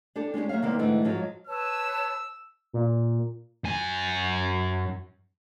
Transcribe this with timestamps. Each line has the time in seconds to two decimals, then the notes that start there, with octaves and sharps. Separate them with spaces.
0.16 D4 G4 A4
0.34 G#3 C#4 D4 G4
0.49 F#3 A#3 C#5 E5 F5
0.62 C3 D#3 G3 A#3 B3
0.79 G#2 D3 E3 G#3 A3 G5
1.04 G#2 F3 F#3
1.47 B4 C#5 A5 E6
2.73 A#2
3.64 F#2 G#5